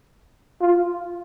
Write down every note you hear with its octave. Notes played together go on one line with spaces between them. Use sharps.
F4